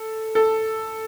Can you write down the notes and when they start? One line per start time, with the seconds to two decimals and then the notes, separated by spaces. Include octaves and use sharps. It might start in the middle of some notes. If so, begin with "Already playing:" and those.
Already playing: A4
0.35 A4